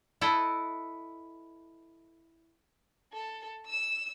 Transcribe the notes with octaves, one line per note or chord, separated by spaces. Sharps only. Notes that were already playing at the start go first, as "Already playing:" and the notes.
E4 A4 B4 D#5
A4
E6 E7